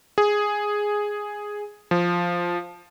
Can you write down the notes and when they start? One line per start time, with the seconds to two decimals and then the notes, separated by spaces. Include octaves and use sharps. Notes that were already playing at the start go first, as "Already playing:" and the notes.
0.18 G#4
1.91 F3